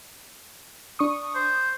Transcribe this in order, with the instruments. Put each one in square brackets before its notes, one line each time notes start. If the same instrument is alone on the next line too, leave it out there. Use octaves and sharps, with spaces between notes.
[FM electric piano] D4 C#6 D#6
[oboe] C5